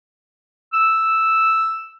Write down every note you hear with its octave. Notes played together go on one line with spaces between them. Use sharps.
E6